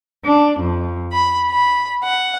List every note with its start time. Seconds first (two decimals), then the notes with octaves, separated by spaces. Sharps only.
0.24 D4
0.59 F2
1.12 B5
1.49 B5
2.02 F#5